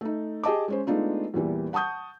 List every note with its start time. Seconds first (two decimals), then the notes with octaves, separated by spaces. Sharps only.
0.01 A3 D#4
0.44 G4 G#4 D#5 A5 D6
0.68 G#3 C#4 C5
0.87 G#3 A3 B3 D4 D#4 F4
1.34 E2 A#2 E3 G3
1.73 F#5 A5 C#6 D#6 G6